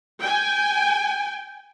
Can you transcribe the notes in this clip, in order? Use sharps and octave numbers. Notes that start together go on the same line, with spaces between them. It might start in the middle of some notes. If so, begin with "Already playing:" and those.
G5 G#5